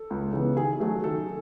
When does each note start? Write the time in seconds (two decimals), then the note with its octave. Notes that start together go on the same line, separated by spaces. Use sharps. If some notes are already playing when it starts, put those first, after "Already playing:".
Already playing: A4
0.10 C#2
0.33 C#3 E3 B3
0.57 D#3 G#4
0.80 F#3 A3 G#4
1.04 D#3 A4